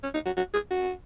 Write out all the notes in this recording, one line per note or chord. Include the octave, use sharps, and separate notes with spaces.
C#4
D#4
F#4
F#4
G#4
F#4